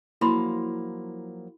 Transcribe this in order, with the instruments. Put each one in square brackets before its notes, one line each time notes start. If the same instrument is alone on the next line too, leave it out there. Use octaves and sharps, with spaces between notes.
[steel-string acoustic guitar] F3 F#3 A#3 [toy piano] E4 B5 C6